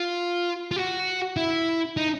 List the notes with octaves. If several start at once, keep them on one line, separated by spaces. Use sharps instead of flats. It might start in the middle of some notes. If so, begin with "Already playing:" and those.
Already playing: F4
F4
F#4
E4
D#4